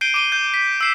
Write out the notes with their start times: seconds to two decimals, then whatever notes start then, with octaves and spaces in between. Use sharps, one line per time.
0.01 G6 C7 D7 D#7 G7
0.14 D6 D#7 G7
0.32 G6
0.54 B6
0.81 E6 C7 E7